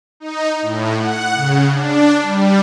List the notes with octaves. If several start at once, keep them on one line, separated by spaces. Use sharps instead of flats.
D#4
A2
F#5
C#3
D4
G3